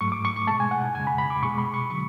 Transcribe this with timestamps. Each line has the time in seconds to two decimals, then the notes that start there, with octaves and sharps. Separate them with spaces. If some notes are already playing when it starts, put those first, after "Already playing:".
0.01 G#2 F#3 A3 C#6
0.12 D6
0.25 C#6
0.36 C#6
0.47 B2 G#3 A5
0.60 G#5
0.71 F#5
0.95 F2 C#3 G#3 G#5
1.07 B5
1.18 B5
1.30 D6
1.42 B2 G#3 C#6
1.58 B5
1.74 C#6
1.90 D3 F#3 C#6